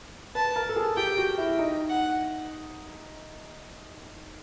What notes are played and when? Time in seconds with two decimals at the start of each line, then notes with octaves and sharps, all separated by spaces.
0.35 B4 A5
0.56 A#4
0.69 A4
0.76 G#4
0.97 G4 G5
1.17 F#4
1.38 E4
1.59 D#4
1.89 F#5